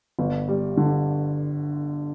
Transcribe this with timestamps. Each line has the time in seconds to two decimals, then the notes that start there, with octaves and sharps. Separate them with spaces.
0.19 G1
0.48 G3
0.77 D3